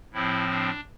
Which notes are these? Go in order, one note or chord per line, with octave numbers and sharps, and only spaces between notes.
A2 F3 C4 E4
D4